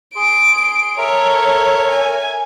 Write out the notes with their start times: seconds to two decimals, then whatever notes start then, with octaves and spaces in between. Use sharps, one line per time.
0.15 G#4 C6 D7
0.98 A4 A#4 C#5 E5 A#5
1.91 G#5